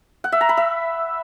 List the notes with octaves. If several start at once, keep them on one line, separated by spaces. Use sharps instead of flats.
F#5
E5
A#5
B5
E5